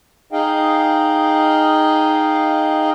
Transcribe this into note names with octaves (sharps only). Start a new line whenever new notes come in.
D#4 G#4 D#5 F5 G5